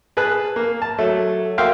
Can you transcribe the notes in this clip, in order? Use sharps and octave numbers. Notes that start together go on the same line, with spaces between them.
G#4 B4 A5 F#6
A#3
A5
F#3 A3
A#3 F#4 E5 F5 G5 C6